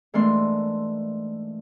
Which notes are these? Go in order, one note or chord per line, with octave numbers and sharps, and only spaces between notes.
G#2 E3 A3 A#3 D4 C6